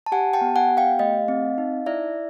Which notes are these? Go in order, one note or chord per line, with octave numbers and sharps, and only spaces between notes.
A5
G4 F#5 G#5
G5 A5
B3
F#5 G#5
G4
F5 G5
A3 D#5 F5
C4
D#4
E4 D5 E5